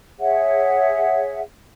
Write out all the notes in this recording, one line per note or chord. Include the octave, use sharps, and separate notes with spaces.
G#4 C#5 E5 F#5